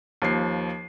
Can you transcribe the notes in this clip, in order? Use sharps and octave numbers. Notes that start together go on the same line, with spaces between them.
D#2 F3 C7